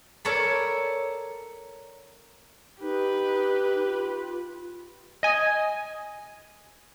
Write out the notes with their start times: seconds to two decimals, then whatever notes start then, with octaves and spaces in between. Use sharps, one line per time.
0.25 A4 A#4 C#5 D5 A5 B5
2.81 D#4 G4 B4
3.87 F4
5.23 D#5 G#5